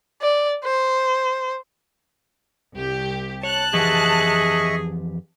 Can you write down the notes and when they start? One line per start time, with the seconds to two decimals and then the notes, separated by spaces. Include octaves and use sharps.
0.22 D5
0.64 C5
2.75 C2 G4
3.43 C#5 A5 F#6
3.74 F2 E3 G4 G#4 D#5 E5 C#6